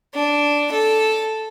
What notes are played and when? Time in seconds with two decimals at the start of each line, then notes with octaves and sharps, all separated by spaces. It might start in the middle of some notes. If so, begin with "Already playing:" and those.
0.14 D4
0.72 A4